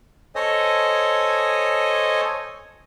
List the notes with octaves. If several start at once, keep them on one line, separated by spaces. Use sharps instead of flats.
A4 C5 C#5 D#5 G#5 D#6